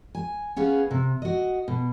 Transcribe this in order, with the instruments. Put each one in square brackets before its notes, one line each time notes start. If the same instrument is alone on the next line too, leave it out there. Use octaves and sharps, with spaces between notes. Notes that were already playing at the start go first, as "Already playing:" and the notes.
[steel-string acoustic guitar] G#5
B3 C#4 G#4 F5
C3
F#4 D#5
B2